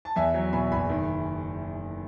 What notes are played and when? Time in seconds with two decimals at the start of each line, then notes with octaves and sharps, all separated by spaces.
0.05 A5
0.16 E2 E5 G#5
0.34 F#3
0.53 B2 G#5 B5
0.71 F#1 G#5 B5
0.89 D#3